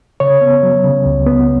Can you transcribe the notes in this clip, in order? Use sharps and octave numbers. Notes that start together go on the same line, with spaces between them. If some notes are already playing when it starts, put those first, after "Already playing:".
C#3 C#5
B3
F#3
C#3
C#2
B3